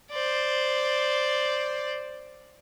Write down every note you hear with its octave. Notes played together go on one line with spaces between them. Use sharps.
C5 D5